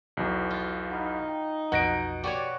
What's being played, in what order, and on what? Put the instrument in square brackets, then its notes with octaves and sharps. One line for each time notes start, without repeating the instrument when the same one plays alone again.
[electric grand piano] B1 E2
[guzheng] F4
[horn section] D#4 [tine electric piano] F#5 B5 F6
[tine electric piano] G5
[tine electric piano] B1 F2 F#6 [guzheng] B2 [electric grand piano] F#5 A#6 D7
[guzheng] F#4 B4 C#5 [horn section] G4 D5